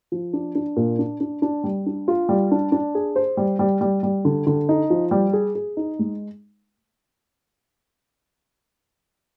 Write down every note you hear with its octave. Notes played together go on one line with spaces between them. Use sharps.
F3
D4
D4
A#2
D4
D4
D4
G3
D4
F4
G3
D4
D4
G#4
C5
G3
G3
G3
G3
D3
D3
D#4
F3
G3
G#4
G#4
D#4
G#3